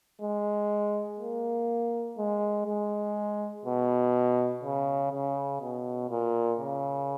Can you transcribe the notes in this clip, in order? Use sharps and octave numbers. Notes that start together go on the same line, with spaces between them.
G#3
A#3
G#3
G#3
B2
C#3
C#3
B2
A#2
C#3